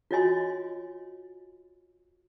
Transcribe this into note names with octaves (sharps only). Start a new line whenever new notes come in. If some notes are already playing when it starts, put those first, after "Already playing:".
F4 F#4 C#5 D#5 G#5 C6